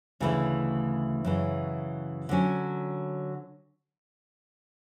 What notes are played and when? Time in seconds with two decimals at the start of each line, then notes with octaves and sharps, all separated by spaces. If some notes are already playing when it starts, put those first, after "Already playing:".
0.20 D2 C#3 E3 A3 E4
1.25 F#2 C#3 E3
2.29 D3 F#3 C#4